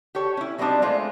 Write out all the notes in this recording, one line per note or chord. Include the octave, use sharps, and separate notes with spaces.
G4 A4 C#5
C#4 E4
F#3 G3 B3 C4 D4 D#4
G#3 A3 F4 C5